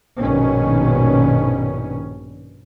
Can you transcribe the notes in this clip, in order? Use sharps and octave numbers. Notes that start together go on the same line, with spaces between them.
A#1 G2 B2 D#3 C#4